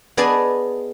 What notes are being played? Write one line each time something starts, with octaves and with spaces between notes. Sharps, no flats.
B3 G#4 D5 D#5 G#5 A5